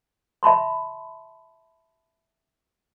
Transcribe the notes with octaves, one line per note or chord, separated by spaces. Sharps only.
E5 A5 B5 C6